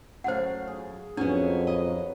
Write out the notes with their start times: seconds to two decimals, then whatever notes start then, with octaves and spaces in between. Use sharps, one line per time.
0.24 F#2 A3 C5 F5 F#5
0.68 G#4
1.17 F2 F#3 B3 C#4 D4
1.67 B4 D#5